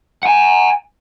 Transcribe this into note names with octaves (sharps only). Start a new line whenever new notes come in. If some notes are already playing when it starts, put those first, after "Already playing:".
F#5 G#5